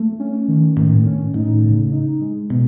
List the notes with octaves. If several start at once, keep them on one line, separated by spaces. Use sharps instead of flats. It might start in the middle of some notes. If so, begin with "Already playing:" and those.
Already playing: A3
C#4
D#3
A2 D#3
C#4
A2 D#4
C#3
D#4
G#3
B2 G#3